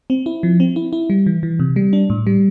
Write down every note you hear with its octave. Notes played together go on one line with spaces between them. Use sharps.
C4
E4
F3
C4
E4
E4
G3
E3
E3
C3
G3
D4
A2
G3